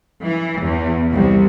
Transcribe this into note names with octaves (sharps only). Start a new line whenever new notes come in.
E3
E2
C2